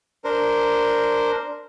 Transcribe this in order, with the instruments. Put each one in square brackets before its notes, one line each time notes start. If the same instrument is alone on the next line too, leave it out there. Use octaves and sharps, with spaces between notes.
[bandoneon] D4 A#4 C5